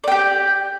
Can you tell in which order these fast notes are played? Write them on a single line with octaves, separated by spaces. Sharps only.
D5 G5 G4